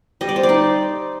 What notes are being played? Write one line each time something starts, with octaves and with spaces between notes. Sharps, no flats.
G3 D#5
D5
C5
D5
D#4